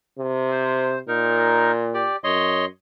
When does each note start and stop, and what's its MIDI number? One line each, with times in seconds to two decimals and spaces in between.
0.18 1.00 48
0.52 0.99 72
1.08 2.08 46
1.08 1.72 63
1.08 1.72 70
1.94 2.16 67
1.94 2.16 74
2.24 2.65 42
2.24 2.65 73
2.24 2.65 75
2.24 2.65 84